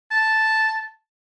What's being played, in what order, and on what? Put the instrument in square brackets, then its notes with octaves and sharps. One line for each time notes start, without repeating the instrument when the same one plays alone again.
[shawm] A5